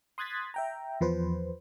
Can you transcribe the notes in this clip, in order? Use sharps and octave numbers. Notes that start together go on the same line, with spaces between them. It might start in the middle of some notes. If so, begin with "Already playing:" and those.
C6 D#6 F#6 G#6 A6 B6
E5 G5 A#5
E2 F3 B4 C5